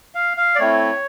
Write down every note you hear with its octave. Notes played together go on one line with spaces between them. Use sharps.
F5
F5
D5
A3 C4 E4 C#5